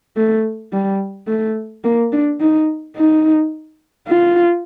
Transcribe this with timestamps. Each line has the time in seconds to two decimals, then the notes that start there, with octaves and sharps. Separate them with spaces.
0.17 A3
0.72 G3
1.27 A3
1.84 A#3
2.13 D4
2.40 D#4
2.97 D#4
4.08 F4